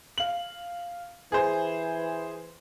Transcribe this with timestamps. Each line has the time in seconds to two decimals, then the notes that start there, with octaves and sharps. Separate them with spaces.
0.18 F5 F#7
1.32 E3 G#4 C5